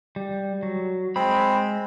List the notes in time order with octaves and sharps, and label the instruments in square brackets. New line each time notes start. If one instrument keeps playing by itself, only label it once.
[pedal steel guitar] G3
F#3
[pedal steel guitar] G#3 B5 [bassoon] C4